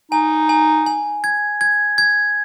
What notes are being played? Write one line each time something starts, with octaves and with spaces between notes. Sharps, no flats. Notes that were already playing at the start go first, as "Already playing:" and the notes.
D#4 G#5
G#5
G#5
G#6
G#6
G#6